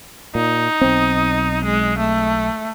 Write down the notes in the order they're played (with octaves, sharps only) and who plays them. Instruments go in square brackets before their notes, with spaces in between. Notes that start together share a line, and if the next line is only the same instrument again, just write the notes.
[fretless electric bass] A#2 [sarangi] D#4
[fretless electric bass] B1 C4
[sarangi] G#3
A3